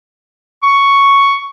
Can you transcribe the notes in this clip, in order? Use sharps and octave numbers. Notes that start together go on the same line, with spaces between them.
C#6